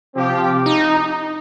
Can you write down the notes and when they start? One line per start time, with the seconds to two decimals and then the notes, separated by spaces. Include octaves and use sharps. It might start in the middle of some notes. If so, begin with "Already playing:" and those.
0.15 C3 F3 C4 G4
0.66 D#4